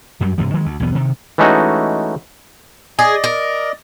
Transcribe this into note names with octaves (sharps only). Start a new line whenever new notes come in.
F#2 F#3 G3
G2 C3 E3
D#3 F#3 G#3
D2
B1 E2 B3
C3 D#3
E3 G#3 A3 C#4 D#4 F#4
G#4 D5 D#5
A#4